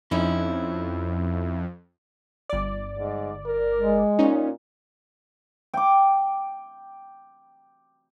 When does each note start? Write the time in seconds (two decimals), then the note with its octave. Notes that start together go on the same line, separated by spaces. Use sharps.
0.11 F2 C#4 D#4 E4
2.50 G1 D5
2.99 G#2
3.45 A#4
3.77 G#3
4.19 A#2 C#4 D#4
5.74 G5 D6